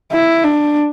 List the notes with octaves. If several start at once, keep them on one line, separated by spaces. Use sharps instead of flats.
E4
D4